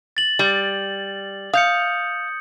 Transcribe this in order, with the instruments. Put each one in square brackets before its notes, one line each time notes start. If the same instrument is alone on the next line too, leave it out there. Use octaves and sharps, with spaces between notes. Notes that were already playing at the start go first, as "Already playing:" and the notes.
[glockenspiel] A6 F#7
[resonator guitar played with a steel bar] G3
[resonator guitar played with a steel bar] F5 [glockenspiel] D#6 G6 C#7